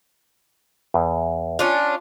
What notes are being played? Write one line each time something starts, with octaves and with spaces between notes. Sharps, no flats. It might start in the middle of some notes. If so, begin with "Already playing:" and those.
E2
C#4 D4 F4